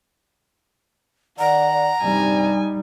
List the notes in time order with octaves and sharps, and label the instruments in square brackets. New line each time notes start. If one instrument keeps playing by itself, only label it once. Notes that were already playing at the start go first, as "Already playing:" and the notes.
[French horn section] D#3 D5 [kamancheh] F#5 [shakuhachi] A#5
[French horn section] G2 C3 D5 [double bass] G3 D#4 [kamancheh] G#5